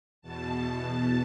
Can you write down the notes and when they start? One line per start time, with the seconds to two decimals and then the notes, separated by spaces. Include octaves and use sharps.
0.22 E2 B2 A5